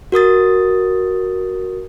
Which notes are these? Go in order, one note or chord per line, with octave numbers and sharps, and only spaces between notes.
F#4 A#4 D#6 A6